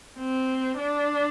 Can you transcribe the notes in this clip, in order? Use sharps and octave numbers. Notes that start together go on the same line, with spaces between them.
C4
D4